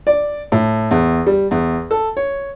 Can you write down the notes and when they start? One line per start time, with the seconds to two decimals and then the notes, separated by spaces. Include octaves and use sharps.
0.07 D5
0.52 A2
0.91 E2
1.27 G3
1.51 E2
1.91 A4
2.17 C#5